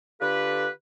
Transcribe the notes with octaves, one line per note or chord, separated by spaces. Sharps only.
D3 F4 G4 A4 B4